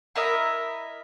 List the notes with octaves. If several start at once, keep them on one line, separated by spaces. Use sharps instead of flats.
E4 A#4 D#5 E5